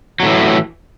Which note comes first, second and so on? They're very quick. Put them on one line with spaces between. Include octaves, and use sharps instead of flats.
F#3 A2 E3